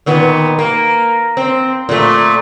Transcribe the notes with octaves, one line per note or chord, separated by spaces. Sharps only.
A#2 D#3 B3
A#3
C4
A#2 A3